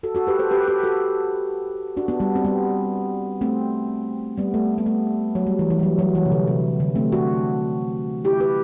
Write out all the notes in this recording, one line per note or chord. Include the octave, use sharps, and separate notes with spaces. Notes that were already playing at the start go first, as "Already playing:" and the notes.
F#4 A4
F#4 A4
G4 B4
A4 C5
G4 B4
G4 B4
F#4 A4
D4 F#4
B3 D4
G3 B3
C4
G3 B3
A3 C4
G3 B3
A3
B3
A3
F#3
G3
E3
E3
G3
F#3
F#3
E3
C3
D3
C3
D3
A3 C4
D4 F#4
E4 G4
G4 B4